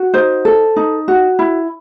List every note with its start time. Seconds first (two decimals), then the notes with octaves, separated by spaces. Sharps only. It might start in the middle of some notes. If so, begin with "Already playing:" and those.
Already playing: F#4
0.14 D#4 C5
0.45 A4
0.76 D#4
1.08 F#4
1.39 E4